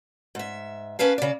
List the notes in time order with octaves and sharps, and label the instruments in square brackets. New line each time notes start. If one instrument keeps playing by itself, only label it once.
[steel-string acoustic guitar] G#2 E5
C#4 A#4 B4 F5 A5
C#3 D5